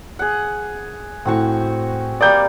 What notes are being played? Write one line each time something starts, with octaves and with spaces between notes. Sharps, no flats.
G#4 F#5
A2 C4 F#4 C#6
G3 A#3 D5 D#6 G6